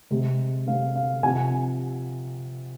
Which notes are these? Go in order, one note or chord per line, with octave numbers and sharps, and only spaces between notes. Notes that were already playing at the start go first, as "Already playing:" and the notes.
C3 G#3 C4
C3 G#3 C4 F5
F5
C3 F3 C4 G#5